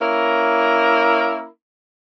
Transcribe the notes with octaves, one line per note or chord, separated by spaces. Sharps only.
A#3 C#4 E4 A#4